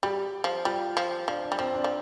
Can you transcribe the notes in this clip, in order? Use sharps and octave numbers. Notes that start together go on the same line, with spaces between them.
G3 G4
F3
G3 F4
F3
F3 D4
D4
G3
F3 C4
D4
F3